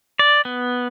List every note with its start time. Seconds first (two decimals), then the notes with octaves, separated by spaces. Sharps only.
0.19 D5
0.45 B3